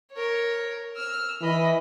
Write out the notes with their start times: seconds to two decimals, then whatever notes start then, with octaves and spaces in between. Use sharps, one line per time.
0.13 A#4 C#5
0.96 E6 F6
1.42 E3 D#5 B5